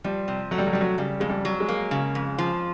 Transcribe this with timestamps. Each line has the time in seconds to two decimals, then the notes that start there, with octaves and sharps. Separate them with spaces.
0.04 F3 G3
0.28 C3
0.51 F#3 A3
0.58 G3
0.67 F#3
0.73 C3 G3
0.81 F#3
0.98 C#3 G3
1.20 F2 G#3
1.29 G3
1.45 F#3
1.60 G#3
1.68 A#3
1.91 C#3
2.15 F2
2.38 F3